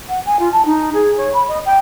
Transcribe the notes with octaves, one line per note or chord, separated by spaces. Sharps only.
F#5
G#5
F4
A5
D#4
G#4
C#5
B5
D#5
G5